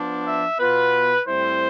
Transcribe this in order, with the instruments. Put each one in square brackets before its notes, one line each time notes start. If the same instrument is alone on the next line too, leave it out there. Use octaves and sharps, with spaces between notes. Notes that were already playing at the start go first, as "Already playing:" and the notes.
Already playing: [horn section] F3 B3 D4
E5
B2 B3 F4 B4
A2 G3 C4 E4 C5